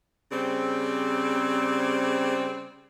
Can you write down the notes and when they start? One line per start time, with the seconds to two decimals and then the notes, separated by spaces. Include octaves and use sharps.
0.32 C#3 G3 C4